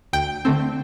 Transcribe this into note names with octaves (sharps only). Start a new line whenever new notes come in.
D2 G5
D3 A3 C4